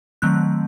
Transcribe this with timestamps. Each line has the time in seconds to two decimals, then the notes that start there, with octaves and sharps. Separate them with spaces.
0.22 D#3 F#3 A3 C4 F#6